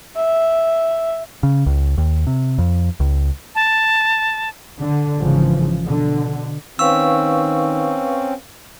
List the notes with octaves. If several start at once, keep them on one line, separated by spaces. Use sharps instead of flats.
E5
C#3
C#2
D#2
C3
F2
C#2
A5
D3
G#1 C#3 E3 F3
B2 D3
D#3 C4 C#4 B4 F5 C#6 E6